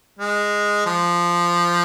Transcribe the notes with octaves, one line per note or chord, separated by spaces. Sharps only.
G#3
F3